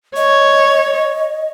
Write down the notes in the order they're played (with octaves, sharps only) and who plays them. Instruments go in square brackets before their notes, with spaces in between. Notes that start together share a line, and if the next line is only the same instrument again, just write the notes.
[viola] C#5 [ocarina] D#5